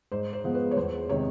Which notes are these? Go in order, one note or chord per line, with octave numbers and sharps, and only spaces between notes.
G#2 C5
C5
F3 G#3 B3
B4
C#5
E2 C5
C3 D#3 G#3 C#5